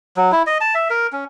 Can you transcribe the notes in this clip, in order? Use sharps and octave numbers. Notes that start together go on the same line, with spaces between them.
F#3
E4
D#5
A5
E5
A#4
C#4